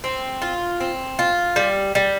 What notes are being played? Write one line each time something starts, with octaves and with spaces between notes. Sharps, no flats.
C4
F4
C4
F4
G3
G3